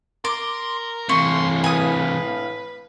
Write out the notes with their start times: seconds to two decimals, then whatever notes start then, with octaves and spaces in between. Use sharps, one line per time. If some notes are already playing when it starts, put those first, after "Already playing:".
0.25 A#4 C6 D6
1.09 A2 C3 E3 F5 C6 C#6
1.64 B4 G#5 D#6